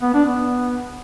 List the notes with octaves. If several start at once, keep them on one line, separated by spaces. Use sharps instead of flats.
B3
D4
B3